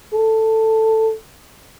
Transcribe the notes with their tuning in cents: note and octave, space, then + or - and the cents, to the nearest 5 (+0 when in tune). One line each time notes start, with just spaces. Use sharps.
A4 +10